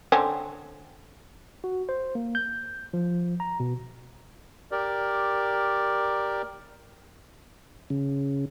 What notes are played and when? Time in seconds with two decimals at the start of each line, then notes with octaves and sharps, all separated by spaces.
0.12 D3 C4 C#4
1.64 F#4
1.89 C5
2.15 A#3
2.35 G6
2.93 F3
3.40 A#5
3.60 B2
4.71 G4 A#4 D5
7.90 C#3